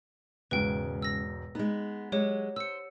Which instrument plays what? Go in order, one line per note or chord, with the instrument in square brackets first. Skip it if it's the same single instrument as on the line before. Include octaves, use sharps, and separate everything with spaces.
[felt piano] E1 G#2 [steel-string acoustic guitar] C#3 [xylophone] B4 G5
[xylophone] E6 A#6
[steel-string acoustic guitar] G#3 B3 [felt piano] D#4
[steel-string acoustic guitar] F#3 G#3 [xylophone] G4 C#5 F#5
[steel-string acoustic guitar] C5 [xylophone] E6 C#7